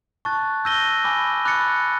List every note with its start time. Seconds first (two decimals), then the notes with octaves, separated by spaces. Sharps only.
0.25 A5 C#6 F#6 A6
0.65 E6 G6 A#6 D#7 G7
1.04 G#5 B5 D6
1.45 B5 D6 F#6 A6 C#7